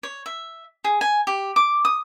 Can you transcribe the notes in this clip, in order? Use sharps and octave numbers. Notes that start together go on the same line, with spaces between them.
C#5
E5
G#4
G#5
G4
D6
D#6